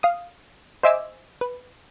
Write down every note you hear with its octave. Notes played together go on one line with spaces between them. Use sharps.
F5 D#6
C5 D#5 E5 G#5 D6 E6
B4